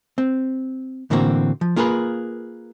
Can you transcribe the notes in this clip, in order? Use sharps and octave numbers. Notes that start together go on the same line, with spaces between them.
C4
A2 D3 E3 A#3 C4 F#4
F3
A#3 F4 G#4 A#4 B4